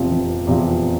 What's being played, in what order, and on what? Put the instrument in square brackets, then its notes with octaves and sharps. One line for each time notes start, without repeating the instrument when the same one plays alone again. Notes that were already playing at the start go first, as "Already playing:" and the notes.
Already playing: [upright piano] F1 E2 C3 F3
F1
E2 C3 F3